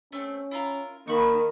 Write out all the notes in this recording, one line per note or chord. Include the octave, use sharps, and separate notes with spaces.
A3 C4 C#4
E4 F4 A#4
D#3 A#3 B5 C#6